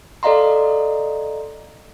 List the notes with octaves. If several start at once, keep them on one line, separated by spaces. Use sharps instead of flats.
A4 D5 D#5 F5 A#5 C6